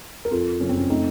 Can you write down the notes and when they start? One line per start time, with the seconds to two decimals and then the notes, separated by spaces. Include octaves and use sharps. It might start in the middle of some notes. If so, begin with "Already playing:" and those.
0.25 A#4
0.31 F2 F4 A4
0.60 F#1 C#4
0.69 C4
0.77 C#4
0.90 A3 C4 D#4